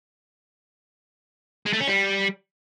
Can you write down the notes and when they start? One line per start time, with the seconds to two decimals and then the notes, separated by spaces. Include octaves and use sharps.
1.66 G#3
1.73 A3
1.80 C#4
1.88 G3